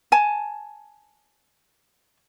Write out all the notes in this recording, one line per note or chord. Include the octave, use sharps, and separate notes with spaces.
G#5 A5